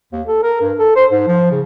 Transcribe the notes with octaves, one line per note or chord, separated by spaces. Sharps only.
D#2
A4
A#4
G2
A4
C5
G#2
F3
C#3